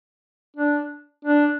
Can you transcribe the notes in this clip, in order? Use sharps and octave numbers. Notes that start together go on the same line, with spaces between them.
D4
D4